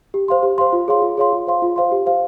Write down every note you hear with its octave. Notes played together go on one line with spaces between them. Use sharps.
G4
C5 F5 C6
G4
C5 F5 C6
F4
G#4 C#5 F5 C6
F4
G#4 C#5 F5 C6
F4
C5 F5 C6
F4
C5 F5 C6
G4
C5 F5